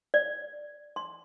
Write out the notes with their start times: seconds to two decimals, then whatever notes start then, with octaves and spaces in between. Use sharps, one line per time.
0.14 D5
0.96 C6